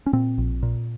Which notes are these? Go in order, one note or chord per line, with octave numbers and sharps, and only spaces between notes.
C#4
A#2 C4
A#1
A#2